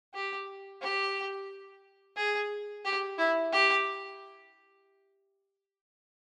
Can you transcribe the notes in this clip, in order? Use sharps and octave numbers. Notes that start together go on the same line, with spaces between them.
G4
G4
G#4
G4
E4
G4